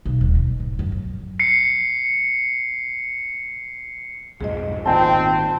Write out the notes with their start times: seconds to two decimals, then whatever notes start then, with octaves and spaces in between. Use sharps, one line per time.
0.06 B1
0.21 D#1
0.35 B2
0.60 G#2
0.79 F#2
0.92 F#3
1.39 C7 C#7
4.41 B1 F2 G#2 G#4 D#5
4.86 G#1 A#2 D#3 C4 F4 D#5 G5 A5